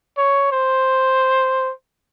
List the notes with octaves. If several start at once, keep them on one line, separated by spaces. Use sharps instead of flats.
C#5
C5